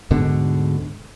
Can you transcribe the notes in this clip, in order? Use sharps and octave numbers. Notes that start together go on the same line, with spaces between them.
D2 G#2 B2 D3